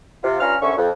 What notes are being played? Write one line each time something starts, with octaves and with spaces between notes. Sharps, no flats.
C3 F4
G2 C#4 F4 A#5 F6
C2 D3 C#4 E5 C#6
F2